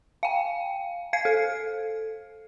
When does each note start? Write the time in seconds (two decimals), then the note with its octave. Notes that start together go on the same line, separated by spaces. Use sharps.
0.23 F5 G5
1.13 F5 G#6 C7
1.25 A4